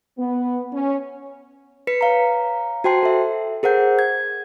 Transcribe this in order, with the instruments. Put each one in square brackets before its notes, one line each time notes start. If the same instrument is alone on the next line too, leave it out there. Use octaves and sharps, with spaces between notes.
[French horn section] B3
C#4
[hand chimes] B4 B6 C#7
C#5 F5 A#5
F#4 C5 G5 A5 C6 C7
A4 E5
G#4 A#4 C5 F#5 G6
G#6